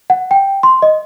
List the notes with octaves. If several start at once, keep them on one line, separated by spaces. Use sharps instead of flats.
F#5
G5
C6
D#5